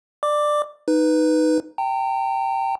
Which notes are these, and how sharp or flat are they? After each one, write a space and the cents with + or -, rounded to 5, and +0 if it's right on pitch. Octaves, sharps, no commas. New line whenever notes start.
D5 +20 D6 +0
D#4 +0 B4 +0
G5 -5 A#5 -40